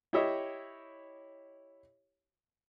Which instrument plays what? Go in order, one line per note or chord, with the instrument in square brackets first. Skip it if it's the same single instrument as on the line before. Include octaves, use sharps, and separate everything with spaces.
[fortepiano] E4 G4 C#5 D#5 E5